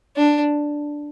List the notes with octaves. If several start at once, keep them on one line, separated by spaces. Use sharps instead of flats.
D4